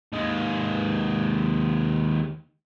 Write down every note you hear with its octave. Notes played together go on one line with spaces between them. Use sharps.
D#2 G#3